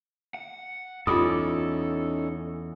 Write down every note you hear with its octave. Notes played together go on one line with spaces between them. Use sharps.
F#5
E2 C#4 D#4 F4 A4 D6 D#6